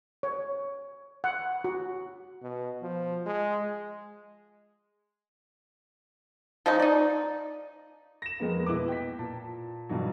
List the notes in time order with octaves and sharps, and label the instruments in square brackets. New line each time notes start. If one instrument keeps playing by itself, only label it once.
[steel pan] C#5
F#5
F#4
[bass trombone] B2
F3
G#3
[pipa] F3 G#3 C#4 D#4
D#4 D5
[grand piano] A#6 E7
F2 G#3 A#3 B3
B2 E4 B4 D6
G5 B6
A#2 A5
G2 B2 E3 F#3